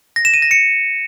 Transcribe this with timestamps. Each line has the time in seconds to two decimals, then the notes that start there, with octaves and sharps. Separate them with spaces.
0.16 A#6
0.25 E7
0.34 D#7
0.42 A#6
0.51 C#7